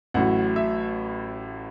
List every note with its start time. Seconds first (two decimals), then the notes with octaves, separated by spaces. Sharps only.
0.14 A1 A2 F#3 F#5
0.56 E5